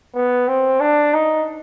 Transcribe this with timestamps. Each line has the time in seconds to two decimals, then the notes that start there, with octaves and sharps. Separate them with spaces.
0.15 B3
0.48 C4
0.80 D4
1.14 D#4